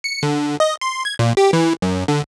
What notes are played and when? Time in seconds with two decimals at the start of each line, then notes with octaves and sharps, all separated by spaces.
0.04 C#7
0.23 D3
0.60 D#5
0.81 C6
1.05 G#6
1.19 A#2
1.37 G4
1.53 E3
1.82 F#2
2.08 D3